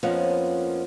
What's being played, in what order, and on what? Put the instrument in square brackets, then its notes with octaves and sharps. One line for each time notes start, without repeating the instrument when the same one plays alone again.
[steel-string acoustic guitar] F2 F3 A#3 B3 C#4